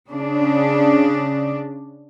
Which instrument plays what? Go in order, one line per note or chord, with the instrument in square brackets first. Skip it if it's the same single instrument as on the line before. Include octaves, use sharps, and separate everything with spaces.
[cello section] C#3 D4